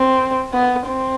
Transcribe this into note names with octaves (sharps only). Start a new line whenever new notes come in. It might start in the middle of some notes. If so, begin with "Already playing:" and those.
Already playing: C4
B3
C4